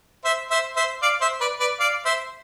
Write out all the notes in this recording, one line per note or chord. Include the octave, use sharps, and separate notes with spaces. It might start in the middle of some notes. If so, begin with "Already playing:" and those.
C5 E5
C5 E5
C5 E5
D5 F5
C5 E5
B4 D5
B4 D5
D5 F5
C5 E5